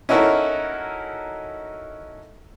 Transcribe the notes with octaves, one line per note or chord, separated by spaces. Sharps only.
C#4 D#4 E4 F#4 A4 A#4